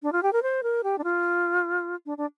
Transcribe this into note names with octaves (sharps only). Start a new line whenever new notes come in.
D4
F4
G4
A#4
C5
A#4
G4
D4
F4
D4
D4